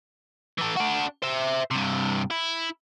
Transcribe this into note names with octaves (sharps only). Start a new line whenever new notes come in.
E3 A4
D4 F#4
C5 E5
G2 C3
E4